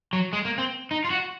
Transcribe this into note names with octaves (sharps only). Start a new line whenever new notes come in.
F#3
G#3
A#3
C4
D#4
F4
F#4